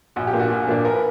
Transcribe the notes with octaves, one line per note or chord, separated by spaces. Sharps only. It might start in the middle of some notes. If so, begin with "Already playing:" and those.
A#1 F#4
G4
A#2 A#3 D4
F#4
A#1 F#4
A#2 A#3 D4
A#1 A#4
B4